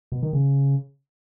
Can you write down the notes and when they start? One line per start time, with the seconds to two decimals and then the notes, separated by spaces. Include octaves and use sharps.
0.12 B2
0.22 D#3
0.33 C#3